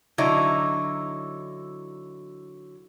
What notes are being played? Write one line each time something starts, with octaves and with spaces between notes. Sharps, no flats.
D3 F#3 D#4 E4